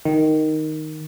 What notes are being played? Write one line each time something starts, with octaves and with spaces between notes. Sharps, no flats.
D#3